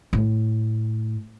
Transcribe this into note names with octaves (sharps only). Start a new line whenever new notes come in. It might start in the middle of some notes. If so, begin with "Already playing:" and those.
A2